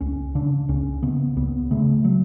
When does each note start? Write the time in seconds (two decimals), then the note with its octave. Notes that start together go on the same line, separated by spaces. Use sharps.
0.01 C#2 C#4
0.35 C#3 D4
0.69 C#2 C#4
1.03 C#3 B3
1.36 C#2 B3
1.71 C#3 A3
2.05 F#3